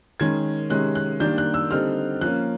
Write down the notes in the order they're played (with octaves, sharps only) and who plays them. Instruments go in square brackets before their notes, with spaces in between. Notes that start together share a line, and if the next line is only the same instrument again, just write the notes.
[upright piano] D#3 G#3 C#4 G#6
C3 D#3 G#3 C#4 F#6
F#6
D#3 G3 A#3 D4 G6
F#6
E6
D3 G3 C4 D#4 F6
F3 A#3 C#4 F#6